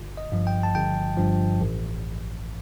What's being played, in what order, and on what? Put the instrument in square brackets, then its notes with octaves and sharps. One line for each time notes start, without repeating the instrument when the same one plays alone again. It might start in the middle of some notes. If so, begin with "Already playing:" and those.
Already playing: [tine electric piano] G1
D#5
G2 F3
G5
A5
G1 G5
G2 F3
A1